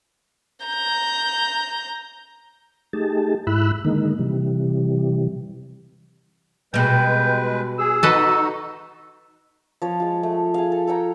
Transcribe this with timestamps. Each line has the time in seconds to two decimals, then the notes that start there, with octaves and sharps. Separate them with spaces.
0.66 A#5 G6
2.93 A3 D#4 G4 G#4 A5
3.47 G#2 E4 B5 E6 F#6
3.85 D3 D#3 G#3 A#3 D#4
4.19 C3 E3 G3
6.74 B2 G3 G#3 B4 G5
7.79 G#4 E6
8.03 D#4 F#4 A4 B4 D#5
9.82 F3 C#5
10.00 G#3 F4
10.23 A3
10.54 G#4 F5
10.72 A4
10.87 A4 C#5 G5 A#5